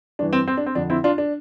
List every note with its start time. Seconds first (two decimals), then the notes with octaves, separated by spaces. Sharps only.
0.19 G2 E3 D4
0.33 C4
0.48 C4
0.57 D4
0.66 C4
0.75 F2 D3 D4
0.90 C4 E4
1.04 D4 F4
1.18 D4